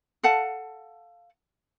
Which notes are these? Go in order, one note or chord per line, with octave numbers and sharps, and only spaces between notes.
A4 F5 F#5 A5